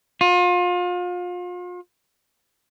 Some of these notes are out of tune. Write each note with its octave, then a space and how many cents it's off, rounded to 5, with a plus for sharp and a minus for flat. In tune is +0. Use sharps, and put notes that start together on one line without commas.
F4 +35